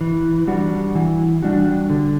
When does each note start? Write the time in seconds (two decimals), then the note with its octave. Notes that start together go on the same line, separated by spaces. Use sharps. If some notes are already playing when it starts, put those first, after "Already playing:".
0.01 E3
0.47 G3 D4 F#4
0.95 E3
1.43 G3 D4 F#4
1.90 D3